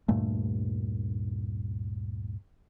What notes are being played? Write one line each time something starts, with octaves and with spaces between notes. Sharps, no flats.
D2 G2 A#2 A3